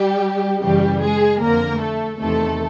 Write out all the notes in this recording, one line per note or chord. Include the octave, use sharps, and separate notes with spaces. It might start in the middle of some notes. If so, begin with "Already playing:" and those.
Already playing: G3 G4
F#2 C#3 E3 G3 G4
G#3 G#4
F2 D3 A#3 A#4
A3 A4
E2 C3 D#3 A3 A4